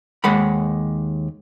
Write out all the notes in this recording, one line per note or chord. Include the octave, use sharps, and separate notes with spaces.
D#2 G#3 F#5 B5